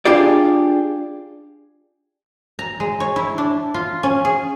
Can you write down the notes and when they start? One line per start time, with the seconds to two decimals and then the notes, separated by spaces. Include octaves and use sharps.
0.05 D4 F4 G4 G#4 D5
2.59 A#5
2.80 G#3
3.00 C#5
3.16 E4
3.38 D4
3.74 F4
4.03 C#4
4.25 G#4